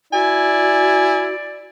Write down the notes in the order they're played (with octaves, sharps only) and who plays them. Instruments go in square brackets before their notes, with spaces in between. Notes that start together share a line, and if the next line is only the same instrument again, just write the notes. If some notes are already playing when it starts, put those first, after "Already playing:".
[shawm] E4 [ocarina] F#4 [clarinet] D5 [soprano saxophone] G#5